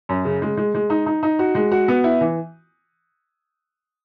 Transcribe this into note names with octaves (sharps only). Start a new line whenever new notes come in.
F#2
C#3
G#3
G#3
G#3
D#4
D#4
D#4
F#4
G#3
F#4
B3
E4
E3